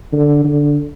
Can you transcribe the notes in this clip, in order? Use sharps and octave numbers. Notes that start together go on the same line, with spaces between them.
D3
D3